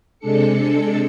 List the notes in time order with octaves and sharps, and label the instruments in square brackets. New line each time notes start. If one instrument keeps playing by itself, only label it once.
[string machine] C3 G#3 D4 A4 C#7